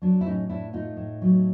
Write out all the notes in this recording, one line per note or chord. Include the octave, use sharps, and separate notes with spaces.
F#3 D4
E4
A2 C#4 D#4
A2 D4 E4
A3 D#4 F4
A2
F#3